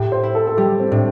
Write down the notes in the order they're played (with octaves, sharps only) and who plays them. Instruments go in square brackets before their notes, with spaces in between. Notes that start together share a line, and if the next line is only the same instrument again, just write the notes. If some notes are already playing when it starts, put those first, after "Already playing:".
Already playing: [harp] A2 [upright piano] G4
[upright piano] C5
[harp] E4
[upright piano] A4
A4
[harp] G3 [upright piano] G4
[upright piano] C4
[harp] A2 [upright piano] D4